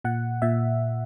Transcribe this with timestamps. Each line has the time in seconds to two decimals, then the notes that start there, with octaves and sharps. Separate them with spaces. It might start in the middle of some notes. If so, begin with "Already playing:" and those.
0.04 A#2 F#5
0.42 A#2 E5